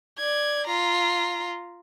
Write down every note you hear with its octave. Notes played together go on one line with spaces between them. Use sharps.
D5 G#6
F4 A#5